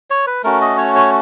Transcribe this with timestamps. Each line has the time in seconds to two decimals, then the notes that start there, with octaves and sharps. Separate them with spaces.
0.10 C#5
0.27 B4
0.44 A3 C#4 F#4 A#4
0.61 D#5
0.78 C#5
0.95 C#5